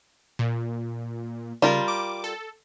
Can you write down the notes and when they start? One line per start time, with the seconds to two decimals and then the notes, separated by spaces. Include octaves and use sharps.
0.39 A#2
1.62 C#3 G3 F4 A#4
1.88 D6
2.24 A4